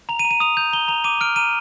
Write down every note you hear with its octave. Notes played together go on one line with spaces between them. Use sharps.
A#5 F7
D#7
A#5
D#7
D#6 F7
G6 F7
A#5 G7
A#5 F7
D6 D#7
F6 D7
A#5 D#7